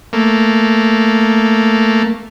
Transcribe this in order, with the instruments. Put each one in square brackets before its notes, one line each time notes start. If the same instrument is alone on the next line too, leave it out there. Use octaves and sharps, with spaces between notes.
[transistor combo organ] A3 A#3